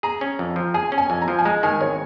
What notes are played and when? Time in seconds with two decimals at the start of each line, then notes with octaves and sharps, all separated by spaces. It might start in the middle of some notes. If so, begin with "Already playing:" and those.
0.03 G#4 A#5
0.21 C#4
0.39 F2
0.56 F3
0.74 G#4 G#5
0.92 C#4
0.98 G#5
1.10 F2
1.22 A#5
1.28 F3
1.39 G#5
1.45 G#3 A#5
1.63 D#3 G#5
1.81 G#1 C#5